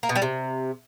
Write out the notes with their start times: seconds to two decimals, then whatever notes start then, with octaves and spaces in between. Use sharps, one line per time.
0.03 A#3
0.09 B2
0.16 G3
0.22 C3